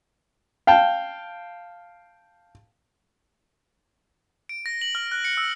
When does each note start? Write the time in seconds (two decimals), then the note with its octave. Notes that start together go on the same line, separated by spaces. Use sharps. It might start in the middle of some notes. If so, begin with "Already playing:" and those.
0.67 F5 G5 A5
4.49 D7
4.66 A#6
4.81 F#7
4.95 F6
5.12 F#6
5.25 C#7
5.37 E6